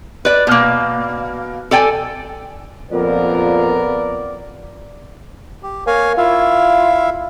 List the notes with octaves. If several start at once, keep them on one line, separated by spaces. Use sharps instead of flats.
B4 D5
B2 A#3
A4 D5 G5 G#5
F2 A#2 B3 F4 A#4 D5
G4
A#3 C#5 F5 G#5
E4 F4 E5 F5